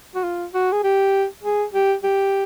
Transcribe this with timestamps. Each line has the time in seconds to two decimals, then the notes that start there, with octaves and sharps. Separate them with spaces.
0.15 F#4
0.24 F4
0.54 F#4
0.72 G#4
0.84 G4
1.43 G#4
1.73 G4
2.03 G4